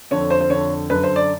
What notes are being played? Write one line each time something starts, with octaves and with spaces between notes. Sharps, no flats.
F2 D3 C#5
C5
C5
F2 D3 C#5
F#2 D3 B4
C5
D5